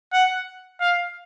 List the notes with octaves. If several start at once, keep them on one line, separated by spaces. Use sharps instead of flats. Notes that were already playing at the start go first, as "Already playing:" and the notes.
F#5
F5